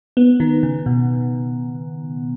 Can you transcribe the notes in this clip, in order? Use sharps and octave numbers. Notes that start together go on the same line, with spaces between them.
B3
D#3
C#3
B2